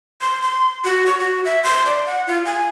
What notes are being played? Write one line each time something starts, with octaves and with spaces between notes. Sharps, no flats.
C6
C6
F#4
C#6
F#4
E5
C6
D5
F#5
F4
G#5